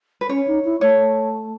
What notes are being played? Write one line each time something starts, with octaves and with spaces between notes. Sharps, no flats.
B4
C#4 C#5
D#4
E4
A3 C#5